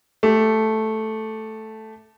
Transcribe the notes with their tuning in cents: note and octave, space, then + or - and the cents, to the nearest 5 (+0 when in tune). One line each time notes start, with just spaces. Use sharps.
A3 -5 G4 +0